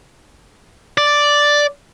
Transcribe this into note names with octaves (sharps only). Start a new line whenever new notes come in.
D5